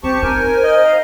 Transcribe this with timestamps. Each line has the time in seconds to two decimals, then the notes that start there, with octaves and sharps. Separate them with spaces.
0.03 C4 G4 C5 A5 C#6
0.23 D#4 A#4 G#5
0.64 D#5
0.85 F5